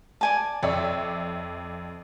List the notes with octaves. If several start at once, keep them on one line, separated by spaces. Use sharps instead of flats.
D5 G#5 A5
F2 C#5 D5 E5